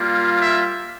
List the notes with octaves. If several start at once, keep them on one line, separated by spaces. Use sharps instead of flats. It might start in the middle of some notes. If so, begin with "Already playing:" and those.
Already playing: G3 A#3 F4
E5